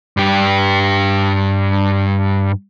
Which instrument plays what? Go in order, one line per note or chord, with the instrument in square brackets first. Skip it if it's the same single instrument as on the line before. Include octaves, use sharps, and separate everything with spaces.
[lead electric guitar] G2 G4